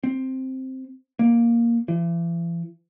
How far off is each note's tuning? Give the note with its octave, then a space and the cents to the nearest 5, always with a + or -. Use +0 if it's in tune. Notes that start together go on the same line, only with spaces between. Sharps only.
C4 +0
A#3 +5
E3 +45